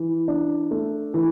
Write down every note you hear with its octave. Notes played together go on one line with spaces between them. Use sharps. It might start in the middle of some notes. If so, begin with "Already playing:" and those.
Already playing: E3
D4
A3
E3